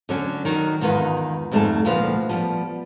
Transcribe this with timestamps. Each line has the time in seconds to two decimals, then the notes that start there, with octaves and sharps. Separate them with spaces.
0.09 D3 F#3 C#4
0.45 D#3 F#3
0.81 E2 G#2 D#3 F4 B4
1.52 F2 G#2 G3 A3 G#4 A5
1.85 D2 A#2 F3 F4 B4
2.29 F3 G3 B3